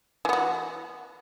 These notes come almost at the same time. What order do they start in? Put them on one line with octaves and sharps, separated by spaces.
E3 B3 F#4